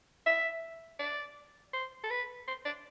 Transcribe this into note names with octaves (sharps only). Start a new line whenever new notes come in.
E5
D5
C5
A4
B4
C5
D5